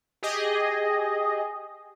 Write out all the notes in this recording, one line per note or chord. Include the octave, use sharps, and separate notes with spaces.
G4 G#4 D#5